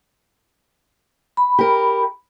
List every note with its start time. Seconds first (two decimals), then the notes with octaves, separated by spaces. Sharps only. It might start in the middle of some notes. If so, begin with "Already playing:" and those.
1.37 B5
1.59 G4 A#4